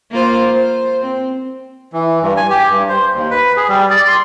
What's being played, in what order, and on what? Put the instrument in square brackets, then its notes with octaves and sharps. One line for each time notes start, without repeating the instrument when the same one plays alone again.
[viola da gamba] A#3 F4 C5
C5
C4
[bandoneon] E3
G2
G#5
G4
G2
C5
D#2
B4
G#4
G3
D5
C6